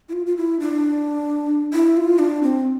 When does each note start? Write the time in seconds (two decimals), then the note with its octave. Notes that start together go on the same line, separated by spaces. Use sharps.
0.09 E4
0.13 F4
0.26 F4
0.37 E4
0.60 D4
1.73 E4
1.97 F4
2.19 D4
2.43 C4